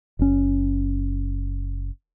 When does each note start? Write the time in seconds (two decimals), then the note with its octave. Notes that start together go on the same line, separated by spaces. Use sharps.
0.19 F#1 C#4